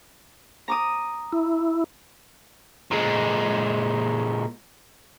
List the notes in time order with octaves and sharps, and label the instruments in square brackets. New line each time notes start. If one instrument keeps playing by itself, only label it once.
[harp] A#5 D6 D#6
[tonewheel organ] E4
[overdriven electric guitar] A#2 G#3